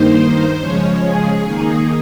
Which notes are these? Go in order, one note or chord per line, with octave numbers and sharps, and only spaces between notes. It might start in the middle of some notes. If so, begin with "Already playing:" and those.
Already playing: G2 D#3 A#3 D#4 C5
C#3 F3 G#3 C#4 C#5
G#4
D#3 A#3 D#4